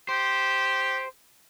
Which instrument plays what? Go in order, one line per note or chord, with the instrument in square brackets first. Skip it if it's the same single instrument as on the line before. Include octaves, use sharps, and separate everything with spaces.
[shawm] G4 [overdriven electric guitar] C5